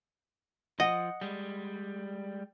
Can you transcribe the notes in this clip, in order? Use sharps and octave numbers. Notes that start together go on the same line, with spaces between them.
F3 D#5 F#5
G3 G#3